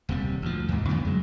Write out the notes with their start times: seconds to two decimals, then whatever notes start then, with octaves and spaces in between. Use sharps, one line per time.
0.09 D#1 C3 G3
0.42 D2 F3
0.69 D#2 G#2
0.89 F2 C#3 B3
1.05 F#3 G#3